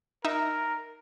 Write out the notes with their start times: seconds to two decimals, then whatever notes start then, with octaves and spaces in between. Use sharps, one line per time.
0.25 D#4 A#4 E5